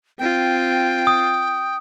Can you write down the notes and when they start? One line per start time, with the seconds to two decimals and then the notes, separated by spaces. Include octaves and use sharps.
0.19 C4 F4 G5
1.07 D#6